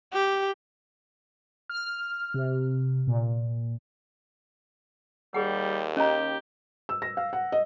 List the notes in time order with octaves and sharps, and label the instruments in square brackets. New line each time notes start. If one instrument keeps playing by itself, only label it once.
[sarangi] G4
[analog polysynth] F6
C3
A#2
[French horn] D#2 [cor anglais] G3 [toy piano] G#4 F#5
[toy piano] C#4 A#5 [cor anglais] G4 [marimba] D#5
[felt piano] E6
A#6
F5
F#5
D#5